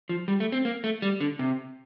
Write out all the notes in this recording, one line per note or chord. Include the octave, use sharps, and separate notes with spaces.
F3
G3
A3
C4
A#3
A3
G3
D3
C3